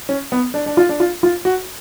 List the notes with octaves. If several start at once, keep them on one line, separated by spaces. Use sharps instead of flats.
C#4
B3
D4
D4
F4
D4
F4
F4
F#4